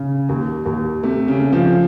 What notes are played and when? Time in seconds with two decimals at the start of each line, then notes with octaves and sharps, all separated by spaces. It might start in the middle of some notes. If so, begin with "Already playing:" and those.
Already playing: C#3
0.29 D#2
0.66 D#2
1.03 C3 A3
1.28 C#3
1.40 A3
1.52 C#3 F3